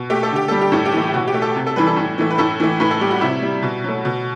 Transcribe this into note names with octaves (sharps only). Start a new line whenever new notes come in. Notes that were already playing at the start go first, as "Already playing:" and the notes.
Already playing: B2
A3 G4
A4
D3 G4
G3 A4
G4
A2 A4
G4
E3 A3
G4
B2 F#4
G4
A3
A4
C3
A4
E3 G3 B4
A4
A2
E3 A3
B4
A2 A4
E3 A3
A2 B4
A4
G3 G4
F#4
C3 E4
G3
B2
F#3 A3
B2